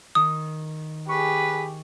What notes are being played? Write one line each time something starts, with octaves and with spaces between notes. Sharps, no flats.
D#3 D#6
G4 G#4 B4 C#6